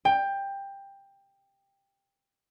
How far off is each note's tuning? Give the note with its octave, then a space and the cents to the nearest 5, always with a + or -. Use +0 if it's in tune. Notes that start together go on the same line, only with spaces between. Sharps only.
G5 +15